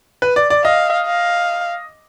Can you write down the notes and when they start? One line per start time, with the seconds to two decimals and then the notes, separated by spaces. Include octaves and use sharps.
0.22 B4
0.36 D5
0.50 D5
0.64 D#5 F5
1.06 F5